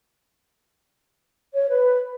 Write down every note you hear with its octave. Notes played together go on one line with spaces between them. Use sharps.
C#5
B4